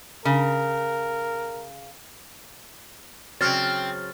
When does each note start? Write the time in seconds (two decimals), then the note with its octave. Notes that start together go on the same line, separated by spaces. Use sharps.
0.25 C#3 A#4
3.41 C#3 F#3 C4 F6 A6